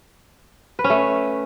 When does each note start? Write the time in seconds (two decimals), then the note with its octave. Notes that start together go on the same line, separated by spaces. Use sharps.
0.79 B4
0.84 C#4
0.90 A3